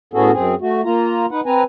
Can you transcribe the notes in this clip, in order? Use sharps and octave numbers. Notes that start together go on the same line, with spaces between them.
A2 B3 C#4 F#4 G#4 A4
F#2 C4 G#4
A3 F#4
A#3 F4 A#5
D#4 B4 F#5
C4 B4 G#5 A#5